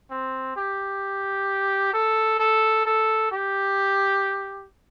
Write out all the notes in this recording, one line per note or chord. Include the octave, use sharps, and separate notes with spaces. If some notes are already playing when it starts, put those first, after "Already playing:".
C4
G4
A4
A4
A4
G4